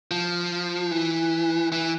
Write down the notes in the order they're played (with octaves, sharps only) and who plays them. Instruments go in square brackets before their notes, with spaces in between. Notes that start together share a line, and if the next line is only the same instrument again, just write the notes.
[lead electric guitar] F3
E3
E3